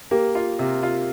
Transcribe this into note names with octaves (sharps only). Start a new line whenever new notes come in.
A#3 G4 A#4
F4
C3
F4